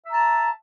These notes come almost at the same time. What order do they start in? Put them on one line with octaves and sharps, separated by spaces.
E5 A#5 A5